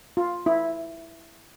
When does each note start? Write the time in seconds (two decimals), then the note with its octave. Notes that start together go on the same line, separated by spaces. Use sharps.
0.17 F4
0.46 E4